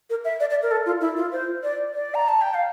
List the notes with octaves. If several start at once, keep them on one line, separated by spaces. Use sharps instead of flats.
A#4
E5
D5
D5
A#4
A4
F4
E4
F4
C5
D5
D5
A#5
A5
G5
F5